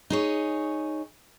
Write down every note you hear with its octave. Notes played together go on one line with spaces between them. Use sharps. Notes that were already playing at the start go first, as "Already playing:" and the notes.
D#4 G#4 C#5